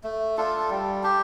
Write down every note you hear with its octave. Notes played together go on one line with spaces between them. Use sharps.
A3
D4 F4 A4
G3
D4 G4